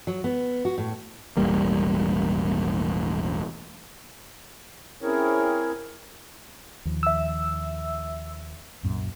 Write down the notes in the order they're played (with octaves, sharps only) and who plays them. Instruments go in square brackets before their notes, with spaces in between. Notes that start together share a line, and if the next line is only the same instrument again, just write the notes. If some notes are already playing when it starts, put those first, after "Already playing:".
[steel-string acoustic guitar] F#3
B3
F#4
A2
[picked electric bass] E1 A1 G3 A#3
[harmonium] C4 C#4 E4 G#4 A#4 C#5
[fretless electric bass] D#2 F3
[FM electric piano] E5 E6
[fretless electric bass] C2 F#2 A#2